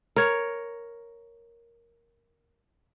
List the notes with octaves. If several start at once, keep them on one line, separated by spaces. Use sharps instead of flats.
A#4 C#5